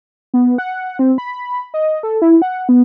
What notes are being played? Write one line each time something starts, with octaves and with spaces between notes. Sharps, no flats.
B3
F#5
C4
B5
D#5
A4
E4
F#5
B3